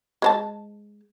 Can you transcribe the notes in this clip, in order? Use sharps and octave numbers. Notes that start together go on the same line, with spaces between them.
G#3 C5 A5